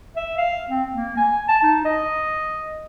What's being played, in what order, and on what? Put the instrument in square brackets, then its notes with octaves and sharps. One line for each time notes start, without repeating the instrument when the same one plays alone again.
[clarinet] E5
F5
C4
A#3
G#5
A5
D#4
D#5